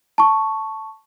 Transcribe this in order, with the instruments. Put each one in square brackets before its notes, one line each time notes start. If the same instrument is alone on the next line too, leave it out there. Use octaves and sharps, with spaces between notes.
[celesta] A5 C#6